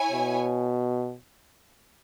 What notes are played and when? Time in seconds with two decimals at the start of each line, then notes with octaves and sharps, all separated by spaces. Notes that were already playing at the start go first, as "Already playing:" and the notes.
Already playing: E4 C#5 G#5
0.12 B2